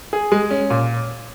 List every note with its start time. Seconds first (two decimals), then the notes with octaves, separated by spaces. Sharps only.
0.13 G#4
0.32 G#3
0.51 C#4
0.70 A#2